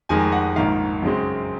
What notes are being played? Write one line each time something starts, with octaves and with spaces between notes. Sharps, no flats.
F1 F2 D#3 G#3 G#5
F#5
A#1 G#2 D#3 F5
F#2 C#3 G#3 C4